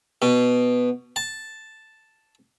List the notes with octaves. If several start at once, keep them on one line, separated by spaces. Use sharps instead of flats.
B2
A5